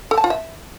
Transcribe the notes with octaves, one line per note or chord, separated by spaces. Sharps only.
A4
A5
F4
E5